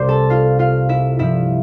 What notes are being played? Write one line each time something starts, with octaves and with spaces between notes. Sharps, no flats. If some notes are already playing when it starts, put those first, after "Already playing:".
Already playing: C2 C3 C5 D5 C6 D6
A4 A5
F4 F5
F4 F5
E4 E5
G2 F3 E4 E5